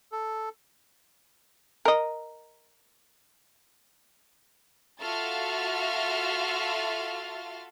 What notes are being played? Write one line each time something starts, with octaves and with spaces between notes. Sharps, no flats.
A4
A#4 D#5
F4 F#4 A4 E5 F6 A6